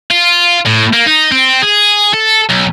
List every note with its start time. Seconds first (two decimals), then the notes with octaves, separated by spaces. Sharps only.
0.11 F4
0.66 A2
0.93 A#3
1.07 D#4
1.32 C4
1.62 G#4
2.14 A4
2.49 B1